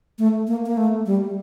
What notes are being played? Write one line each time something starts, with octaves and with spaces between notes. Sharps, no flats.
A3
A#3
A#3
A3
G3